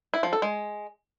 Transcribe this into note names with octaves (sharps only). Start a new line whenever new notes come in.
E4
F3
A4
G#3